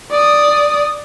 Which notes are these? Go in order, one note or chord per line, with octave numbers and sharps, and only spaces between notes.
D5 D#6